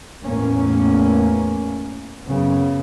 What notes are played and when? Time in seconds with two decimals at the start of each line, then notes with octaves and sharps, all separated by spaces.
0.24 E2 A2 A#3 C#4
2.25 F#2 C#3 B3